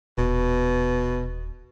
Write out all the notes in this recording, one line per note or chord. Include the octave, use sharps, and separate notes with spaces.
D#1 B2